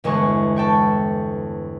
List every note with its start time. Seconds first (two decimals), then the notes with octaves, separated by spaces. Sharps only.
0.04 G1 E2 G#3 C#6
0.56 A4 G5 C#6